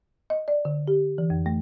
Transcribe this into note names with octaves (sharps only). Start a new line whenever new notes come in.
D#5
D5
D3
G4
E3
F2
A3